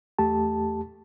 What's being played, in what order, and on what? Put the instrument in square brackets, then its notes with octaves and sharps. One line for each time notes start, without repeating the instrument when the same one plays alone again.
[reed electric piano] E2 A3 G4 A5